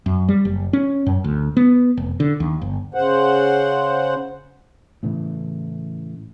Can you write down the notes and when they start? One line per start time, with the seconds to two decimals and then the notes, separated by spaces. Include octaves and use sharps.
0.06 F#2
0.29 G3
0.45 F#1
0.73 C#4
1.06 F#2
1.24 D2
1.57 B3
1.97 F1
2.20 D3
2.40 D#2
2.61 G1
2.94 C#3 C5 F#5
5.03 A2 C#3 E3 A3